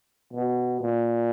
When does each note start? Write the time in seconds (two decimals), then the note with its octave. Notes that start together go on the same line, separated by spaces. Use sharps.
0.33 B2
0.80 A#2